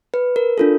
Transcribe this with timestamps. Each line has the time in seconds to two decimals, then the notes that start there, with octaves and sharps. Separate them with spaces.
0.14 B4
0.36 A#4
0.58 D4 F4 A4